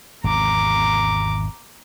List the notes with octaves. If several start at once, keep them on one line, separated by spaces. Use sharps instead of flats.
G#1 E2 C3 A#5 D6